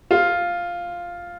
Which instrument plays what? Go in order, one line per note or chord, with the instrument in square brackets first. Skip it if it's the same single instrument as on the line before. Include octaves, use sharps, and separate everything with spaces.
[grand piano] F4